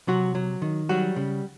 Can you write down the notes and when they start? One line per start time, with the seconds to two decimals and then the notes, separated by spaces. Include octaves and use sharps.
0.07 C3 F#3 F#4
0.35 F#3
0.62 D#3
0.89 F#3 G3 F#4
1.16 C#3